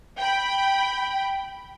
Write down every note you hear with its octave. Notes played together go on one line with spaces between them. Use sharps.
G5 B5